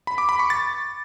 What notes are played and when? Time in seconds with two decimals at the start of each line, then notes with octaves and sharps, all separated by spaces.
0.07 B5
0.18 D6
0.29 B5
0.39 C#6
0.50 A6